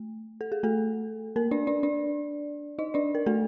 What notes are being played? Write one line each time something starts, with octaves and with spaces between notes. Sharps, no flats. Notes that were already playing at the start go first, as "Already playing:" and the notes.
Already playing: A3
A4
G#4
A3 A4
A#3 A#4
D4 D5
D4 D5
D4 D5
D#4 D#5
D4 D5
A#4
A3 A4